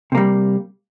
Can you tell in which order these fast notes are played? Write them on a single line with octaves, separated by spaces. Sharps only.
C3 A#3 G3